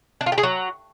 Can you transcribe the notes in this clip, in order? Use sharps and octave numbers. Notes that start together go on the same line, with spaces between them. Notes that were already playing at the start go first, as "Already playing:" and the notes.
D4
F4
G4
G#4
F#3